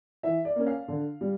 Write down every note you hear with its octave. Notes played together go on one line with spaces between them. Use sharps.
E3 E5
D5
A#3 C#4
F5
D3
G3